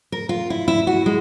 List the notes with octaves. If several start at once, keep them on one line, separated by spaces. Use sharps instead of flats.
A#4
F4
E4
E4
F#4
G#3